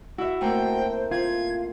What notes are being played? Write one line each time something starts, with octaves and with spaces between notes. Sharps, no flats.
E4 F#4 E5 F#5
A3 A#3 C4 C5 G5
C4 F4 G#6